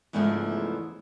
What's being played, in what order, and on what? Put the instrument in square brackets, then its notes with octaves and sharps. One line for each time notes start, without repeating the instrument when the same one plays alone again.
[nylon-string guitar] E2 G#2 C#3 E3 F3 A3